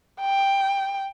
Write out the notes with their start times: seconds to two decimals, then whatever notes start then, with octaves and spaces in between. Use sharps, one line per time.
0.21 G5